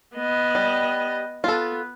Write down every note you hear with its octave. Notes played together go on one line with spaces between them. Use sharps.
B3 D#5
G3
B3 F4 A4